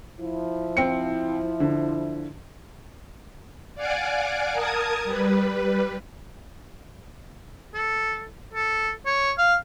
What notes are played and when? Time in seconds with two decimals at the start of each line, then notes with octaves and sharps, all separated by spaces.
0.19 F3 E4
0.77 C4 C#7
1.60 D3
3.75 D5 F5 F#5 G#5 D6
4.52 A#4 A5 D#6 G#6
5.04 G3 B4
7.74 A4
8.53 A4
9.05 C#5
9.38 F5